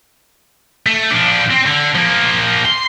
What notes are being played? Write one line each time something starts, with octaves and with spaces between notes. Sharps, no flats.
A3
F3 D4
C4
D3
F3 A#3
C6